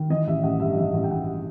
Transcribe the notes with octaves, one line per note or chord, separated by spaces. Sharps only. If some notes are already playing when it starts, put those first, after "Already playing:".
Already playing: D#3
E3 D#5
A1 E5
A1 F#5
G2 E5
E3 E5
A1
G5
A1 F#5